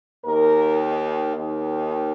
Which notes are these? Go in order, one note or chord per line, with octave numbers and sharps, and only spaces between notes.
D#2 D#3 A#4
D#2 D#3